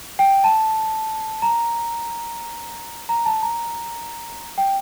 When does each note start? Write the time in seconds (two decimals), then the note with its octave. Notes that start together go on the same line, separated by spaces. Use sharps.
0.19 G5
0.44 A5
1.42 A#5
3.09 A#5
3.26 A5
3.42 A#5
4.58 G5